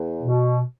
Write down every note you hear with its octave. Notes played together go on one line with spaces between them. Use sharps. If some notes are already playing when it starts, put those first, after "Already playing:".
Already playing: E2
B2